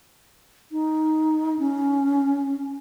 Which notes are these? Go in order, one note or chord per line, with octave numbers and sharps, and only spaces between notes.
D#4
C#4